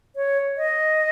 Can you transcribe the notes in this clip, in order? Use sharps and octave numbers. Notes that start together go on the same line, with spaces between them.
C#5
D#5